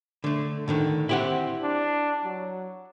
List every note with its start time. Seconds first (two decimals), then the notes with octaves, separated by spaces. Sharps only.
0.24 D3 A3
0.68 A2 D3 D#3
1.09 C4 E4 G4 F#5
1.63 D4
2.24 F#3